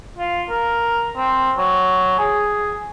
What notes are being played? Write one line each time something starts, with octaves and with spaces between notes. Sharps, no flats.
F4
A#4
C4
F#3
G#4